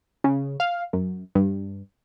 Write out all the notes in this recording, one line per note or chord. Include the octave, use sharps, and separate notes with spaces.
C#3
F5
F#2
G2